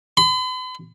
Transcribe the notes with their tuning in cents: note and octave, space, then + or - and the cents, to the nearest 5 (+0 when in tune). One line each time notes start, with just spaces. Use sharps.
B5 +45